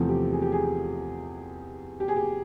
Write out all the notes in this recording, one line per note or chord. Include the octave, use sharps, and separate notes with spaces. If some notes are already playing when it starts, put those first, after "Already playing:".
Already playing: E2 C3 F3 A3 C4
G4
G#4
G4
G#4
G4
G#4
G4